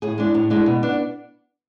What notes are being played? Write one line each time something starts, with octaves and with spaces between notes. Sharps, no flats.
A2 G#4
G#3 D4
A2
G#3 D4
B2
B3 D4